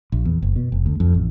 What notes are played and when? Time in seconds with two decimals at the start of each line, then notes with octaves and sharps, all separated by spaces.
0.12 A#1
0.25 E2
0.42 F#1
0.56 B2
0.72 F1
0.86 D2
1.00 F2
1.14 A1